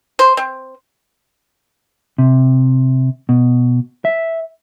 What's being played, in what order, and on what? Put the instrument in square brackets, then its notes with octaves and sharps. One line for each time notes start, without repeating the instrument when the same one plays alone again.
[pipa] C5
C4
[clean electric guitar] C3
B2
E5